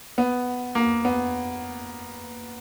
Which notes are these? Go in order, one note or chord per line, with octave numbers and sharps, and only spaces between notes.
B3
A#3
B3